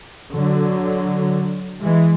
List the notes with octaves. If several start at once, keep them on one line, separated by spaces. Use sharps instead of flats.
D3 F#3
E3 G#3